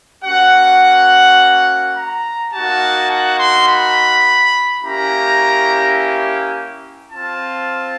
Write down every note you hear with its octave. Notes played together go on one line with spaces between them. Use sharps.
A#3 C#4 F#4 F#5
A#5
A#3 D#4 F#4 A5
F#5
C6
B5
A#3 C#4 E4 G4 A#5
C4 F4 A5